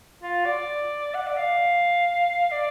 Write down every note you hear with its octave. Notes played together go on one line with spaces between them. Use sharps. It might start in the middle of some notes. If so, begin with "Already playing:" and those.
F4
D5
F#5
D5
F5
D5